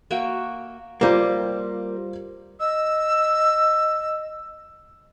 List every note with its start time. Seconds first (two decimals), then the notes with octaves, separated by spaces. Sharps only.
0.11 A#3 F#4 E5 G5
1.01 G3 A#3 F4 C5
2.60 D#5 E6